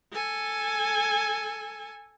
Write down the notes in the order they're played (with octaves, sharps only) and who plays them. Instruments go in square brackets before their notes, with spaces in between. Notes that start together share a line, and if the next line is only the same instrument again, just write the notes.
[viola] A4 G#5